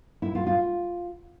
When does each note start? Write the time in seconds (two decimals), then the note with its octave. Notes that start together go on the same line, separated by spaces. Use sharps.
0.22 E4
0.35 F4
0.47 F4